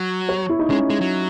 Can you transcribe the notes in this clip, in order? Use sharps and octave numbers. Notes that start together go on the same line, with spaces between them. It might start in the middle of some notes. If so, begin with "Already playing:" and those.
Already playing: F#3
C#5
E4
D#4
G#3 C#4
G#3
F#3